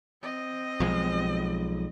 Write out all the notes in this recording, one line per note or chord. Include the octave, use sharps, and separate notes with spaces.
C4 D#5
B1 F3 G#3